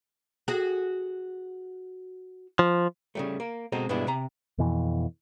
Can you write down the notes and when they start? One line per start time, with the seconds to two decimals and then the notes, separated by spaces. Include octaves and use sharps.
0.48 F#4 G#4
2.59 F3
3.15 C#3 G3 A3
3.40 A#3
3.72 B2 G#3 C4 D#4 F#4 A4
3.89 G2 B2 G#3 B3 D4 E4
4.07 C3 A#5
4.58 F2 B2 E3